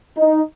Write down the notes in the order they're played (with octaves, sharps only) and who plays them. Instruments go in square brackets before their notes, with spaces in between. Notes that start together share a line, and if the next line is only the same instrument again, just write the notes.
[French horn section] D#4